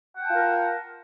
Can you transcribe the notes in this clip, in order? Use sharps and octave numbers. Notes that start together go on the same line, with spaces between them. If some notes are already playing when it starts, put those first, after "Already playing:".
F4 A#4 F#5 G5 A5